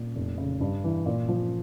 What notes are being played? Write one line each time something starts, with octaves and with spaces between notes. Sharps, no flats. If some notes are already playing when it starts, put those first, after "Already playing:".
Already playing: A#2
F1
C#3
G2
E3
A#2
F3